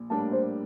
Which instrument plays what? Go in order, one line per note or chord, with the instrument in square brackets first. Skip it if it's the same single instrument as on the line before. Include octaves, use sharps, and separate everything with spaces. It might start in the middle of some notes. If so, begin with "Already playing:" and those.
Already playing: [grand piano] A#1
[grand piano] A2 G3 A#3 D4 [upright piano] A5
[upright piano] C5